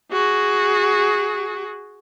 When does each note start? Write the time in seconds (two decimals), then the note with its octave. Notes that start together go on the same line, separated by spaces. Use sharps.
0.12 F#4 G#4